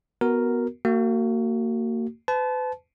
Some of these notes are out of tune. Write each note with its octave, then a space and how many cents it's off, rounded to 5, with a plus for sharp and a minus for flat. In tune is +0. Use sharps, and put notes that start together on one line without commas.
B3 -10 F#4 +0 A#4 +0
A#3 -30 F#4 +20
B4 +40 A5 -25